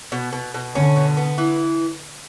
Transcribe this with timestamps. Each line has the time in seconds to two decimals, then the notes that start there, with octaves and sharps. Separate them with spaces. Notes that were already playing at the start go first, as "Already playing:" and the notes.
0.12 B2
0.33 B2
0.54 B2
0.75 D3 C#4
0.96 B2
1.17 B3
1.38 E3